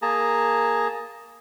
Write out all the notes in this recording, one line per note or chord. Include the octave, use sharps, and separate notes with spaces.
A#3 G#4 A5 A#5